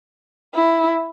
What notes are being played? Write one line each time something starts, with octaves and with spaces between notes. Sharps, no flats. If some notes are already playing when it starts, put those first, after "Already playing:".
E4